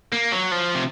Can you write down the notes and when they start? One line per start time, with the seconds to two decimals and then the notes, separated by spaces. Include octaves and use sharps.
0.13 A#3
0.32 F#3
0.52 F3
0.75 C3